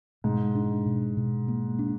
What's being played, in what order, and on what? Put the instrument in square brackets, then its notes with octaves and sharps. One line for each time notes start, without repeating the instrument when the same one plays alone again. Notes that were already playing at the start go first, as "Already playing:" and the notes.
[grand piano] G#2 [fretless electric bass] B2
[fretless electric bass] D4
B2
B2
A#3
D4